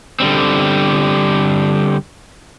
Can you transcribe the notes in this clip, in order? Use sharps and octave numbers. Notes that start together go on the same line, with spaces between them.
D3 G3 C4